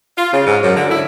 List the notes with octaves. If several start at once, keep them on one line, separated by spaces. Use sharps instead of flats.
F4
C#3
G#2
F#2
D3
E4